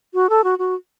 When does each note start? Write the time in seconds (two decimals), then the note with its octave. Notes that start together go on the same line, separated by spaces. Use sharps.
0.14 F#4
0.30 A4
0.44 F#4
0.59 F#4